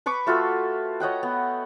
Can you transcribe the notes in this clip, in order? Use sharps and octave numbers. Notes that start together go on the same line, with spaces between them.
B4 B5 C#6 D6
A3 F4 F#4 A4
C#5 D#5 F#5 G5
B3